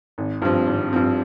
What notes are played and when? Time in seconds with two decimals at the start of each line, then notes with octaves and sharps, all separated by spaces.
0.18 G#1
0.42 G2 F3 C4
0.67 G#1
0.93 G2 F3 C4